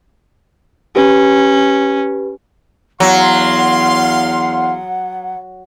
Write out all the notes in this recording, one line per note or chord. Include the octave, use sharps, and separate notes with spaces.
C#4 G4 B4
E2 F#3 F5 F#5 C6